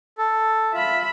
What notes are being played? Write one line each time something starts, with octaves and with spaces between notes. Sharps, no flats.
A4
F4 E5 B5